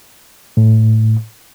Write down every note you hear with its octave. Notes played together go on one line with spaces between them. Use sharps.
A2